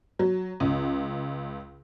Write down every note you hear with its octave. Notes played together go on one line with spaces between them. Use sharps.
F#3
C#2